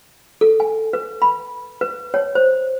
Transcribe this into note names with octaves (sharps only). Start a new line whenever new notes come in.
A4
G#5
B4
B5
B4
C#5
C5